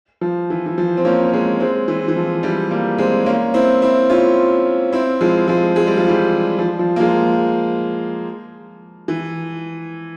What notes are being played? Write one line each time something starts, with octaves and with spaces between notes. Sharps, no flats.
F3
E3
E3
F3
C4
A#3 C#4
C#4
G#3 C4
G#3 C4
E3
E3
F3
E3 G3
G3 A#3
G#3 C4
A#3 C#4
C4 E4
C4 E4
C#4 F4
C4 E4
F3 G#3
F3 G#3
G#3
G3
F3
E3 G3
F3
F3
A#3
F3 G#3
E3